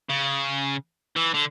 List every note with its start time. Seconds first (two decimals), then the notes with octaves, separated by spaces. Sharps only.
0.09 C#3
1.16 E3
1.34 D3